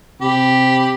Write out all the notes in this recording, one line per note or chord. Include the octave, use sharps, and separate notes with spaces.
C3 G4 B5